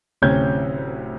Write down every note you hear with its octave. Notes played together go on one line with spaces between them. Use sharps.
D1 D2 C3 C#4 G6 G#6